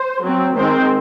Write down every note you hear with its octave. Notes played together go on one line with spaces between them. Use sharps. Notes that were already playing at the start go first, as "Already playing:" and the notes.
Already playing: C5
F#3 C4
D#3 G#3 C4 C5